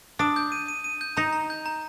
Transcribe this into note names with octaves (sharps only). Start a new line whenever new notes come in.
D4 D#6
G6
D#7
D#7
D#7
G6
D#4 A#5
A#5
G6
A#5